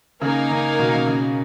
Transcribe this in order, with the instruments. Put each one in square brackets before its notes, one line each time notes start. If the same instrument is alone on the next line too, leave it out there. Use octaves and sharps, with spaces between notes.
[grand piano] C#3 [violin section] A#3 D#4 A#4 F5 G#5
[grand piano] C#3
B2
C#3
C#3